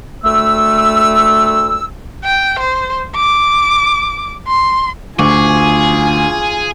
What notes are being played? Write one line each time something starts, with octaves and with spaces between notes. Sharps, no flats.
D2 A3 E6
G5
C5
D6
C6
D2 F4 G#4 G#5 C#6 D6